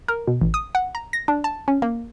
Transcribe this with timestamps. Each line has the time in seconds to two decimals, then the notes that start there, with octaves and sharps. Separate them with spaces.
0.08 A#4
0.27 B2
0.41 A1
0.54 D#6
0.75 F#5
0.95 A#5
1.13 A#6
1.28 D4
1.44 A5
1.68 C#4
1.82 A#3